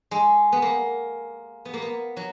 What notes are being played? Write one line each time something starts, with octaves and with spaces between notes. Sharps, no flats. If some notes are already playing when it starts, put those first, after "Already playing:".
G#3
B3
A#3
B3
A#3
B3
F#3